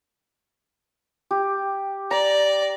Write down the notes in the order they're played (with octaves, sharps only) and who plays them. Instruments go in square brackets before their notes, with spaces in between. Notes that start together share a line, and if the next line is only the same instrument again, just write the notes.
[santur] G4
[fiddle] D5 [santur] A#5